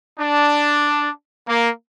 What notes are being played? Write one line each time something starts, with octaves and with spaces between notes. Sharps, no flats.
D4
A#3